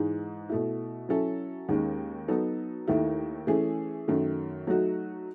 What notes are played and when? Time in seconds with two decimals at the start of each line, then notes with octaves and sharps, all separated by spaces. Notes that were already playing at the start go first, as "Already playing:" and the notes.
Already playing: G#2 E3 G#3 D#4
0.49 B2 A3 E4
1.09 F#3 C#4 E4 A4
1.69 D#2 D#3 G#3 C#4
2.28 F#3 B3 D#4 A4
2.88 D#2 D#3 A3 E4
3.47 E3 A3 C#4 G#4
4.08 F#2 D#3 A3
4.67 F#3 A3 D#4 F#4